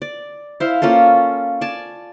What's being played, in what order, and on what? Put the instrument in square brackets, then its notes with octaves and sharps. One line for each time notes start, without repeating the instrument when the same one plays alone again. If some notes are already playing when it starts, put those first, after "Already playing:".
[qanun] D5
E4 C5 F5
A#3 C#4 F4 A4
D5 G#5 A5